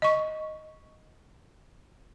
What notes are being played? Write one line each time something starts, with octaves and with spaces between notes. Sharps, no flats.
D#5 C#6